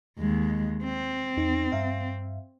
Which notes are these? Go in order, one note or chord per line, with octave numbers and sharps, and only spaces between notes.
D#2 G#3
C4
E2 D#4
G2 E5 F5